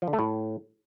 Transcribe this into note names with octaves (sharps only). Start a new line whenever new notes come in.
F3
D3
A3
A2